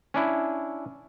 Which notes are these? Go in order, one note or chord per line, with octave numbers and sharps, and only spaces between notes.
C#4 D4 E4